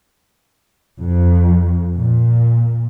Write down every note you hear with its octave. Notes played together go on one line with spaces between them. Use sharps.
F2
A#2